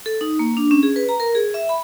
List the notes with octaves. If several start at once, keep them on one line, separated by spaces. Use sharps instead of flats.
A4
D#4
A#3
D4
C#4
G#4
B4
A#5
A#4
G#4
E5
B5